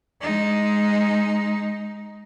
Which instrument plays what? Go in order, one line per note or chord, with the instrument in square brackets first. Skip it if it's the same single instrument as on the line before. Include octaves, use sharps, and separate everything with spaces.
[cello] G#3 D#4